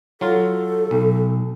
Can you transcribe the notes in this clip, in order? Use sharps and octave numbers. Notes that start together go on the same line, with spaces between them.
F#3 F4 A4
B1